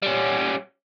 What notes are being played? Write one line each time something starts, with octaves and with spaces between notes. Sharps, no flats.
G3 C#4